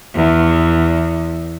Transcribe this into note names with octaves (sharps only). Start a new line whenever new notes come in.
E2